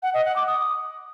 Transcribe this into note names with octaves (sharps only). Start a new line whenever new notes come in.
F#5
D#5
F#5
D6
D#6